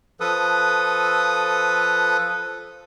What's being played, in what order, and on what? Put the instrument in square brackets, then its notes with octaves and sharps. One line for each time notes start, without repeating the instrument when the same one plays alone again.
[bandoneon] F3 A4 B4 D#6